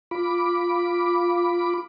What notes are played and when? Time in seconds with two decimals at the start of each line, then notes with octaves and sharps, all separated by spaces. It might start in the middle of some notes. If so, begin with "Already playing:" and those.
0.11 F4 B5 D6